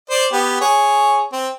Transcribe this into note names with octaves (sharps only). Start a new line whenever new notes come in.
C5 D5
B3 G4
G#4 C#5
C4